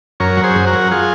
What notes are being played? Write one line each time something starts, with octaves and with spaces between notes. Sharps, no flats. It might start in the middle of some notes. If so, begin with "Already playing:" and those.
F#2 A#4 C#5
F#3
G#4 C5
F#2
F#4 A#4
F#3
F4 G#4